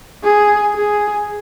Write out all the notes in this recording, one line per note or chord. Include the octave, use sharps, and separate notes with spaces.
G#4
G#4